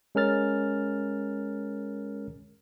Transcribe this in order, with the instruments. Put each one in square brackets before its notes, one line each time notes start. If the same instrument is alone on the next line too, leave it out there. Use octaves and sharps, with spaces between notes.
[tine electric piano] G#3 C#4 A#4 F6 A6